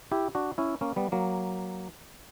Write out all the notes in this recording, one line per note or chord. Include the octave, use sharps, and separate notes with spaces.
E4 G4
D4 F#4
C#4 E4
A#3 C#4
G3 B3
F#3 A#3